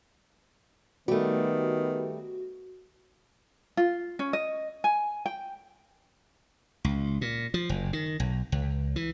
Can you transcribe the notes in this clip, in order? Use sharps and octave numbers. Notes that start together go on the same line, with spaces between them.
D#3 G3 A3 B3 F#4
F4
C#4
D#5
G#5
G5
C#2
A#2
F3
F#1
D#3
B1
C#2
E3